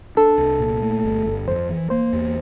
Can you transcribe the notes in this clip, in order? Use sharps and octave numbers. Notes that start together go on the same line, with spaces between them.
D4 A4
C2
A#2
A3
G1
G1
F2 C5
E3
A#3 C5
E2